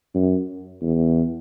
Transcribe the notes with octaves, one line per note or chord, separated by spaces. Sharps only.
F#2
E2